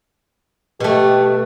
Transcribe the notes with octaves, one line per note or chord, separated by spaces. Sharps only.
B2 A3 G4